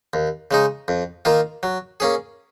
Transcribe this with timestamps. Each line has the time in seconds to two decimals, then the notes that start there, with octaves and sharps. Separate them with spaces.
0.14 D#2
0.51 C#3 G#3 D#4
0.88 F2
1.25 D#3 A#3 F4
1.63 F#3
2.00 A#3 C#4 G#4